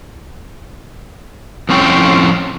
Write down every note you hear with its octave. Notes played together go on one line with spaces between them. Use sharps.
F2 A2 C#4 A4 C5 G5